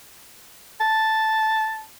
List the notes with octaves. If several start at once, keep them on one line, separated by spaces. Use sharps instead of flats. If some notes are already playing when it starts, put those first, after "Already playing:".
A5